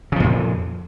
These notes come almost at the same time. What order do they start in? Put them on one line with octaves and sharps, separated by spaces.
C#3 F3 A#2 F2